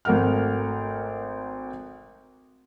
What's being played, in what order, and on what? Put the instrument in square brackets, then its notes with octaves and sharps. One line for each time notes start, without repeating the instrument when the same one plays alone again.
[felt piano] G#1 A3 A#4 F#5 F6